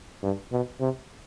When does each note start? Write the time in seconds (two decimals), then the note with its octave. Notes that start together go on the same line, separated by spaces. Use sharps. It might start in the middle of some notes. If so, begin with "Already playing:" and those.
0.23 G2
0.52 B2
0.80 C3